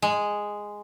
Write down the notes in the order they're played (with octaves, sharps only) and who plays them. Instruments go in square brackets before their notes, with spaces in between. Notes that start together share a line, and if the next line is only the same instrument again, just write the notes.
[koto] G#3